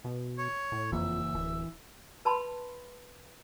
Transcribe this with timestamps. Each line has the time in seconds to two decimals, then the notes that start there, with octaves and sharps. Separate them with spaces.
0.04 B2
0.38 C#5
0.72 A2
0.92 F#1 F2 E3 A#3 E5
1.35 D1 E3
2.25 B4 A5 B5 C6